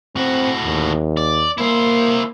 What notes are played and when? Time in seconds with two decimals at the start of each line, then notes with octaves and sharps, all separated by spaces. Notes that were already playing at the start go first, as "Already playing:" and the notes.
0.16 A2 C4 F#4
0.65 D#2
1.17 D5
1.58 A#3 E4 C5